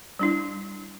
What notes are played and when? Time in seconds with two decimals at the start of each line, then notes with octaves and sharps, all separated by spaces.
0.19 G3 D4 E4